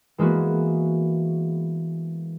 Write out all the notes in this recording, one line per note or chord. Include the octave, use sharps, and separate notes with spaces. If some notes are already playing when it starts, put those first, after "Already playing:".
E3 G#3 A#3 B3 F#4